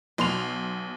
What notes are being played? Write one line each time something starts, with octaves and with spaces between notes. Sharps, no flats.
B1 B2 C6 F7